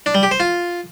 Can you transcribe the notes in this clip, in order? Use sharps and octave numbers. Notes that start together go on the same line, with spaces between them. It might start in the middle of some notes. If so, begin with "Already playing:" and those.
D4
G3
G4
C5
F4